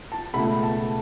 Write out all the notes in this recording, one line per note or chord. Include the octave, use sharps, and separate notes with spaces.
A5
C#2 B2 A3 B5
A5